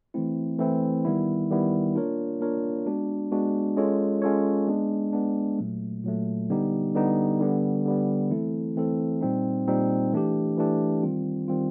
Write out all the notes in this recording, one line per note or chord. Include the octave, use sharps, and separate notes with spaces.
E3 A3 C4 E4
E3 A3 C4 E4
D#3 G3 B3 E4
D#3 G3 B3 E4
A#3 D4 F4 A#4 C#5
A#3 D4 F4 A#4 C#5
G#3 B3 D4 F#4
G#3 B3 D4 F#4
G#3 C#4 F4 A4 C#5
G#3 C#4 F4 A4 C#5
G#3 B3 D4
G#3 B3 D4
A#2 F#3 A3
A#2 F#3 A3
D3 G3 B3 D#4 G4
D3 G3 B3 D#4 G4
D3 G3 B3
D3 G3 B3
E3 A3 C4 E4 A4
E3 A3 C4 E4 A4
A#2 G3 C4 D#4
A#2 G3 C4 D#4
E3 A3 D4 G4
E3 A3 D4 G4
D#3 G3 C4 F4
D#3 G3 C4 F4